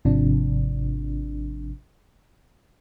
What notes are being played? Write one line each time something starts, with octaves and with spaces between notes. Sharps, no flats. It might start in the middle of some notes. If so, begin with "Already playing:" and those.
G#1 C3 F3 D4